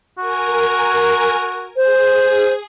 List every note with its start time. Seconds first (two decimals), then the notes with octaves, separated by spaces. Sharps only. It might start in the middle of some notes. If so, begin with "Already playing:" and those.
0.18 F#4 A#4 G#5
1.76 G#4 C5